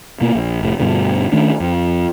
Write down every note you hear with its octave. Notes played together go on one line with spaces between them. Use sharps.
B2 A#3
A#1
F1 A2
G2 B2 D3
D#3 A3 C#4 D4
F2